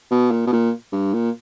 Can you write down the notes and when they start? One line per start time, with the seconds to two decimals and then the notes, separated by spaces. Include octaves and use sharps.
0.11 B2
0.31 A#2
0.47 B2
0.52 A#2
0.92 G2
1.13 A#2